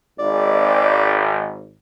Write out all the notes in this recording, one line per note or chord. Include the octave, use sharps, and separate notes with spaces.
G#1 D5